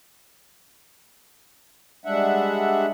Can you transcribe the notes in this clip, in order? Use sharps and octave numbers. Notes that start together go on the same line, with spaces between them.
G3 G#3 D4 E5 F#5